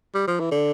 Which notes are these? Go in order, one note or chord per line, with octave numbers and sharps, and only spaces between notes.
G3
F3
E3
D3